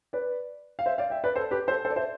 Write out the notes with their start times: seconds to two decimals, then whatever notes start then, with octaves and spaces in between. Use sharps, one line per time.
0.13 B4 D5
0.79 F5
0.86 C5 E5
0.98 D5 F5
1.10 E5 G5
1.24 B4 D5
1.36 A4 C5
1.51 G4 B4
1.67 A4 C5
1.85 A4 C5
1.91 D5
1.96 C5 E5